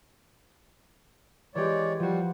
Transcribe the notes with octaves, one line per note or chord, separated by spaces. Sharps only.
E3 G#3 G4 C#5 D5
F3 G3 F#4